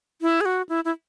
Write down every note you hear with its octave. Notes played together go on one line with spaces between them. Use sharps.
E4
G#4
F#4
E4
E4